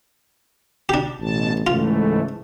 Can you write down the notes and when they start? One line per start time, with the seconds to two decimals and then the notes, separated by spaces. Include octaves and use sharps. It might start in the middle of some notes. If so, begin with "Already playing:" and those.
0.89 D4 G4
1.20 A1 B2 A5
1.67 C#2 G#2 E3 A3 F4